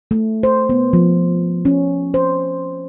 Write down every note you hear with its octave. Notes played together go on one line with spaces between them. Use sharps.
A3
C5
B3
F3
C#4
C5